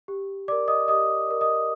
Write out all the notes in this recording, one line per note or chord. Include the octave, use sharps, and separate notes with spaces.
G4
A#4 D5 D6
D#5 D#6
G4 D#5 D#6
A#4 D5
D#5 D#6